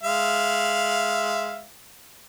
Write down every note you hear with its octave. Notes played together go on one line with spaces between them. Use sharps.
G#3 E5 F5